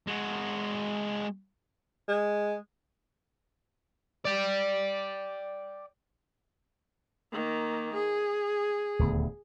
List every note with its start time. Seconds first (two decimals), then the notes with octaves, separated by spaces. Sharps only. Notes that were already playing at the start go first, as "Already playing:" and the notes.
0.08 G#3 F#4
2.09 G#3
4.25 D5 G5
7.32 D#3 A#3
7.93 G#4
8.99 D#1 D2 B3